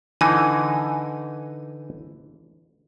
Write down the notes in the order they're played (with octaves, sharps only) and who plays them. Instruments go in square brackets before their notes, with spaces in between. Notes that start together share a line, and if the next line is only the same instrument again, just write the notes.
[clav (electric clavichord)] D3 E3 D#4 [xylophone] G#5